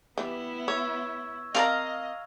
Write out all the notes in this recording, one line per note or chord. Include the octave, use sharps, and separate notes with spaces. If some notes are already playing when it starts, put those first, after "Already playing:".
E3 G3 B3 E4
C#5 C#6 E6 G#6
C4 A#4 D5 D#5 F5 A5 A#5